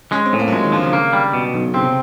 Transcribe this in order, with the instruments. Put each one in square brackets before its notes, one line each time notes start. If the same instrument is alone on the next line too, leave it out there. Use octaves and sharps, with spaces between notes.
[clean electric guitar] G#3 [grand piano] C#4
[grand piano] C4
[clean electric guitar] A2
[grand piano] A#3
F#3
[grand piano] F3 [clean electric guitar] G#3
[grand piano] D#3
[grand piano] D3 [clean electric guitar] F3
[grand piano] C#3
[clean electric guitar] A#3
G3
B2
B1
[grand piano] C#3 [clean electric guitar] C4
[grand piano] C3